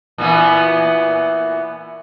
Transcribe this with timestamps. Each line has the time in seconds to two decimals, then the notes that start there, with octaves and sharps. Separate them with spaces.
0.18 A#2 E3 B3